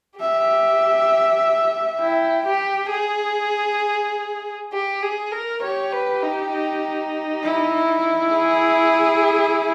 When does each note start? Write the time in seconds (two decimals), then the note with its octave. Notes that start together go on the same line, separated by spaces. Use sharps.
0.20 G4 E5
2.01 E4 G5
2.46 G4
2.91 G#4
4.72 G4
5.02 G#4
5.32 A#4
5.62 G4 C#5
5.92 B4
6.23 D#4
6.53 D#4
7.43 E4
8.34 G#4